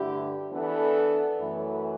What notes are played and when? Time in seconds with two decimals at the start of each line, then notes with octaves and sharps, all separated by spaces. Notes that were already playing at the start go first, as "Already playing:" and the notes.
Already playing: G2 D3 A3 E4 G4
0.52 E3 B3 D4 A4
1.38 F#2 E3 A3